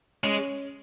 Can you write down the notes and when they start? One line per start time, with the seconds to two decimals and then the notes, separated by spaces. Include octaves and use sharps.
0.23 G#3 C#4